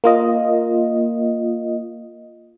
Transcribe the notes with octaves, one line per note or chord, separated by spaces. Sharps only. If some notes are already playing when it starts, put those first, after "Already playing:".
A#3 F4 D#5